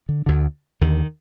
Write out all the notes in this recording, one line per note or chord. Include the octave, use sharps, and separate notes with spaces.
D3
D2 D3
D#2 D3 D#3